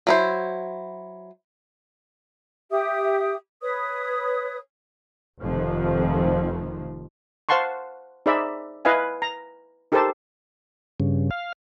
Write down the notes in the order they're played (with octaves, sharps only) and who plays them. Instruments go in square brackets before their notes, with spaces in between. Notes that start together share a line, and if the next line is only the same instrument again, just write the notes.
[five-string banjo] F#3 E4 C5
[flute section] G4 E5 D#6
B4 C#5 D#6
[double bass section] F1 F2 D#3 F3
[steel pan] C5 F5 F#5 A5 C6 C#6
D#4 G#4 C5 D5 E5 B5
E4 B4 D#5 F5 G#5
A#5
D#4 G4 A4 A#4 C5 A5
[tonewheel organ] G2 C#3
F5